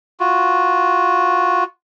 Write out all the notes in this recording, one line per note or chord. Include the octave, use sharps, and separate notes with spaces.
F4 F#4